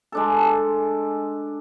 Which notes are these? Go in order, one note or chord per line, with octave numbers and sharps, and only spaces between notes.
G#3 D4 A4